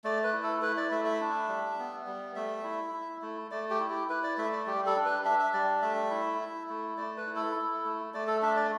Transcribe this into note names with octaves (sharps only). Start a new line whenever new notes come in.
A3 D5
B4
E4
A4
E4 B4
D5
A3 E5
E5
D4
G3
B3
G3
A3 E5
E4
E4
A3
A3 D5
G4
E4
G4
E4 B4
D5
A3 E5
D5
G3 G4
A4
D4
B4
D4 E5
E5
G3 D5
A3 E5
E4
E4
A3
A3 D5
B4
E4
A4
E4
A3
A3 D5
A4
D4 E5
D5